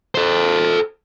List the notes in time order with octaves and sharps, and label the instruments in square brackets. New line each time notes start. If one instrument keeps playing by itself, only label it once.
[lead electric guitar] A4 C5